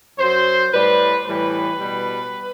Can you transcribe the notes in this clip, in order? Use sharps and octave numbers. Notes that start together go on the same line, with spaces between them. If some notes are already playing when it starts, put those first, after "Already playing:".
F#2 F#3 C5
A2 G3 B4
A2 E3 G3 B4
B2 G3